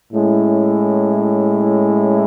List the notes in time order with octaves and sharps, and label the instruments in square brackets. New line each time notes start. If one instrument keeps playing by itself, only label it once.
[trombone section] A2 G#3 C#4 E4